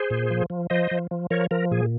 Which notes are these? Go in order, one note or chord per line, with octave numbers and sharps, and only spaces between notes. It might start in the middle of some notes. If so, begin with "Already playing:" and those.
Already playing: G#4 C5
A#2
F3
F3
F3 C5 D#5
F3
F3
F3 A#4 C#5
F3 A#4
A#2 G#4